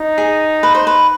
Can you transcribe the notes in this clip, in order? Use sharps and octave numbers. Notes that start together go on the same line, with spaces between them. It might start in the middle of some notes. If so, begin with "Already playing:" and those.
Already playing: D#4
G#4
B4
C5
B4